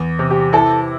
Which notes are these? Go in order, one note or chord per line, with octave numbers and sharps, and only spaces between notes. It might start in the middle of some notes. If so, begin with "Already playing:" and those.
Already playing: E2
C3
G4
E4 A4